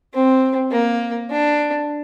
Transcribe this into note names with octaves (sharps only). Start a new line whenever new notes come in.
C4
A#3
D4